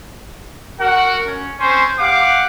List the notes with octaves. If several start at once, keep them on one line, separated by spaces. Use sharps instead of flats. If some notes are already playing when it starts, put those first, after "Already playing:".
F#4 A#4 F#5
C#4
C4 C#4 C5
G4 F5 F#5 D6